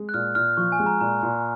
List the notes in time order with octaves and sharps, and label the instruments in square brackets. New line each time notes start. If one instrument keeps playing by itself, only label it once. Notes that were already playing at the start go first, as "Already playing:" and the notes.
Already playing: [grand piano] G#3
[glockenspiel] F#6
[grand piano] A#2 [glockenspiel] F6
[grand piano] A#2 [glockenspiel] F6
[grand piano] F3 [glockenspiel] C#6
[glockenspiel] G#5
[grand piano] G#3
[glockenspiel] A#5
[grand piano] A#2 [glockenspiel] A#5
[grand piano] A#2